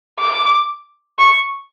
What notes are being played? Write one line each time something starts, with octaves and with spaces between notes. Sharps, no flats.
D6
C#6